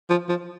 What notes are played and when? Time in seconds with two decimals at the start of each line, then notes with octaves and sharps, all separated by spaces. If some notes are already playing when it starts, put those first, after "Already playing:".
0.10 F3
0.29 F3